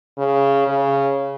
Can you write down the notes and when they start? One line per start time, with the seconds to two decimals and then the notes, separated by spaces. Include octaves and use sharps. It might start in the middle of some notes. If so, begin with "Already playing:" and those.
0.18 C#3
0.67 C#3